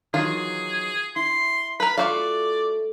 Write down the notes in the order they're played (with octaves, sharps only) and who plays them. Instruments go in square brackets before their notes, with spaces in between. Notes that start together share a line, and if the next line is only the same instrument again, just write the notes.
[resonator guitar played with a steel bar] D#3 E3 F#3 [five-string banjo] F4 [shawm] G#4
[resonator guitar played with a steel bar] E4 [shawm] C6
[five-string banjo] A#4 B4 [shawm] B5
[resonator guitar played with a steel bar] A3 [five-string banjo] F4 F#4 F5 [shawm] D5